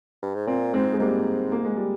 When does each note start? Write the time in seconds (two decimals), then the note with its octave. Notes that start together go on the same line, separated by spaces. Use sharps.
0.22 G2
0.35 G#2
0.47 A#2 C4
0.73 G#2 G#3 C4
0.93 G#3
0.99 G#2 G3 A#3
1.52 A#3
1.65 G#3
1.76 G3